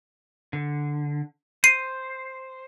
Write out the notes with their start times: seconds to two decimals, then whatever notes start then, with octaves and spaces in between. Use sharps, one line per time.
0.53 D3
1.64 C5 C7 D#7